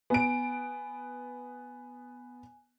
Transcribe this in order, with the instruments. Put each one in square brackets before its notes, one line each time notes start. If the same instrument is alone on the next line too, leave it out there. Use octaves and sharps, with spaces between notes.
[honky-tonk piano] B3 D7 [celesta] G#5